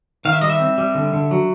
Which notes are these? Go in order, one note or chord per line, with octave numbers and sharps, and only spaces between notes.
D#3 F5
E5
G3 D#5
E5
C4
G3
D3
D3
F#3